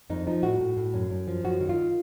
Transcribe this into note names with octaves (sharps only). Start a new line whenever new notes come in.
F2 D#4
F3 D#4
A2 F#4
A2
A2
F#2
F#2
F3
F#2 F#4
D#3
F4